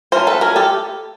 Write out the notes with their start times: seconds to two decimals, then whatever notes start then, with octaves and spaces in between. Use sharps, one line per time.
0.12 F#3 A3 C#4 A#4 C5
0.27 A4 B4
0.41 G#4 A#4
0.56 G4 A4